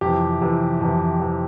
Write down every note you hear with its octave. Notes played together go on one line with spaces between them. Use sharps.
F2 C3 E3 G4
F2 C3 E3
F2 C3 E3
C3 E3